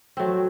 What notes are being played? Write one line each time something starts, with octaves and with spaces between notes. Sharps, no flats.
F#3 A3 C4